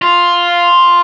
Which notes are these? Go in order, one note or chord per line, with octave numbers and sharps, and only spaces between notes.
F4